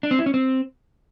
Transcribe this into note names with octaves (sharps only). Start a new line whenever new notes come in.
D4
C4
E4
C#4
C4